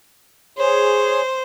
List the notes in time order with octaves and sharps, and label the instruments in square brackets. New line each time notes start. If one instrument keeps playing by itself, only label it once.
[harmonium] G#4 C#5 [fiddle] C5